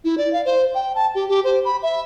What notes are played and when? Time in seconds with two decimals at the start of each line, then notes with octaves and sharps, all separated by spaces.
0.04 E4
0.18 D5
0.33 F5
0.45 C5
0.75 G5
0.95 A5
1.15 G4
1.29 G4
1.44 C5
1.65 B5
1.83 E5